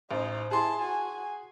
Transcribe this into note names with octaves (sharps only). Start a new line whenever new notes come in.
A1 D#4 C5
E4 G#4 A5 C6
F#4 G#5